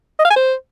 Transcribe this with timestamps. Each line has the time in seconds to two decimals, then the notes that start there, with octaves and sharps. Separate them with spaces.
0.19 D#5
0.25 F5
0.30 G#5
0.36 C5